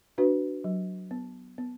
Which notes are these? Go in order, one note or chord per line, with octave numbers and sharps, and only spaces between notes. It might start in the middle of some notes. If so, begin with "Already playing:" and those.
D4 F#4 B4
F#3
B3
B3